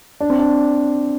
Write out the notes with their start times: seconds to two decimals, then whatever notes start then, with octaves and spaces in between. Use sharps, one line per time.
0.20 D4
0.30 C4
0.39 D4